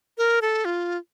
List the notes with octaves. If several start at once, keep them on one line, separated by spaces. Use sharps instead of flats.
A#4
A4
F4